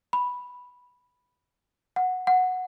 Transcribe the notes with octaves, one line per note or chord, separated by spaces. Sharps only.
B5
F#5
F#5